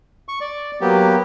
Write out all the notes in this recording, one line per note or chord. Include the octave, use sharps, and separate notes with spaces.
C#6
D5
F#3 A#3 B3 G4